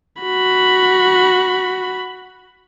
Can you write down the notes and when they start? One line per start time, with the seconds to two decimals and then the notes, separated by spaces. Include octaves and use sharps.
0.23 F#4 B5